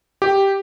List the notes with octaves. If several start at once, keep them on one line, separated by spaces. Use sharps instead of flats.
G4